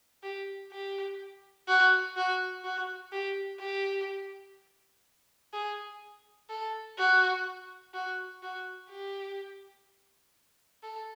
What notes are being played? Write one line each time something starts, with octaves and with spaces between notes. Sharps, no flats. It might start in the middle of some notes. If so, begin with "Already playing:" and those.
G4
G4
F#4
F#4
F#4
G4
G4
G#4
A4
F#4
F#4
F#4
G4
A4